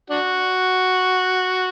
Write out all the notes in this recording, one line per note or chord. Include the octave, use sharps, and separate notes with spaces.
D4 F#4